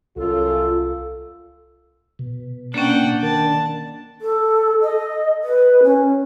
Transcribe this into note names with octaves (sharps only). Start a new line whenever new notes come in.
C2 F#2 F4 A4
B2
A#3 C#4 D4 F#5 G5
D#3 A5
A4
D#5
B4
C#4